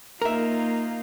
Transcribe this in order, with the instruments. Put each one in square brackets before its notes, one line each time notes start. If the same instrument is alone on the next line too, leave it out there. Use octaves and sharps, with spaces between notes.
[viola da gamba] A#3 D#4 F4 [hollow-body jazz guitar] A#4 E5